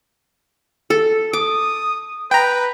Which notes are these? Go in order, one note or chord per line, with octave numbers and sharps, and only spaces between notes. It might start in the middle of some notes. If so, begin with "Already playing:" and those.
A4
D6 D#6
B4 G5 A#5